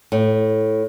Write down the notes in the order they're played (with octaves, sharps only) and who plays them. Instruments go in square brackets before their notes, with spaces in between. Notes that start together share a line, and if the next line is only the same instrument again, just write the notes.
[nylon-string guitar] A2